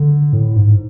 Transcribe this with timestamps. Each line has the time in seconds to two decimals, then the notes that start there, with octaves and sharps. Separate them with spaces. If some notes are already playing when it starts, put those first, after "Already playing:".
Already playing: D3
0.33 A2
0.56 G#2